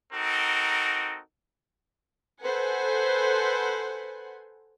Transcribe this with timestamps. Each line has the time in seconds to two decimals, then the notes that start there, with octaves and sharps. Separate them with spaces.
0.13 C4 D#4 F#4 A4 A#4
2.42 A4 B4 C5 F#5 G#5